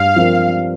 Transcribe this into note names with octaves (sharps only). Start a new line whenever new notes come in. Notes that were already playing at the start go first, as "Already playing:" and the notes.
Already playing: G2 F5
F3 C4 F4 A#4